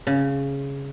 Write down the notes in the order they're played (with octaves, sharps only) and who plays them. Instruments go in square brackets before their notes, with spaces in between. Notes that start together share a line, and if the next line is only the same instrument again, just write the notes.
[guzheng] C#3